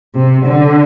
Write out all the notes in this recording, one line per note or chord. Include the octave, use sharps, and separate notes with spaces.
C3
D3